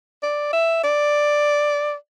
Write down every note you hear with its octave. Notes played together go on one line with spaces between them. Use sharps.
D5
E5
D5